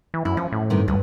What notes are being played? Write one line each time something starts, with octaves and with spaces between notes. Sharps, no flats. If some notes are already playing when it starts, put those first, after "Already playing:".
E3
F#2 E4
F3 C#4
A2
G2 C3 D#3
D2 G2